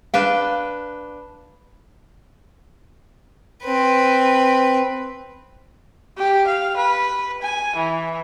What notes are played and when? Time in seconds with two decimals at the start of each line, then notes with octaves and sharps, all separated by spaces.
0.14 D4 B4 F5 G5
3.64 C4 B4
6.18 G4
6.47 F5
6.77 B4
7.42 G#5
7.76 E3